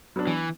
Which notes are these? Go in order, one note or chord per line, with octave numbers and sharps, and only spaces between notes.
F#3 B3 D4
E3